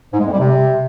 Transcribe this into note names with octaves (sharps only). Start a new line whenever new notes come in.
G#2
G#3
F2
G3
C3